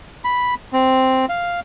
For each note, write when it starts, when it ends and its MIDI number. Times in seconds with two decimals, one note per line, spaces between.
0.24 0.54 83
0.73 1.26 60
1.29 1.60 77